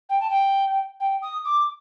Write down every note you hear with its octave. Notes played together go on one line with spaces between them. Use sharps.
G5
A5
G5
G5
D#6
D6